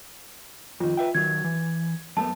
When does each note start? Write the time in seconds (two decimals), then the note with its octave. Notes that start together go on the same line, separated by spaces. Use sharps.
0.80 F2 D#3 F4
0.97 B4 E5 G5
1.15 D#3 F#3 G#6
1.44 E3
2.17 F#2 A3 B3 A5